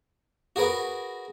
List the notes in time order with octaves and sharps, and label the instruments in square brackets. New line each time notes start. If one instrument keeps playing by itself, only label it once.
[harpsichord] F#4 G#4 A#4 B4